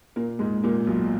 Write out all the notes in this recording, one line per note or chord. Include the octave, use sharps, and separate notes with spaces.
A#2 A#3
G#2 G#3
A#2 A#3
B1 B2